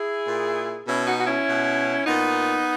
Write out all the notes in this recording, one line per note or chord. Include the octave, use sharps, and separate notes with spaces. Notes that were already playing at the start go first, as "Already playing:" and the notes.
Already playing: E4 G#4
A#2
B2 C#4 E4
D#4 F#4
F#4
C#4 E4
B2
A#2 B3 D#4